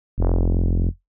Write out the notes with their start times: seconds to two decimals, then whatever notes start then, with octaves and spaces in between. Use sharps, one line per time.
0.18 F1